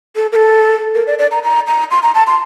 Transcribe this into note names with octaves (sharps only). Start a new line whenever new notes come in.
A4
A#4
A4
A#4
D5
D5
A#5
A#5
A#5
C6
A#5
A5
C6